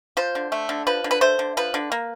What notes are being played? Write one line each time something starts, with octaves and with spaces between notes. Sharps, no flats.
F3 C5
D3
A3
D3
F3 B4
D3
B4
A3 C5
D3
F3 B4
D3
A#3